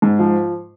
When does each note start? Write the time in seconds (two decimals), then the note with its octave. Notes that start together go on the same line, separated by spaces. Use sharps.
0.02 G#2
0.19 F3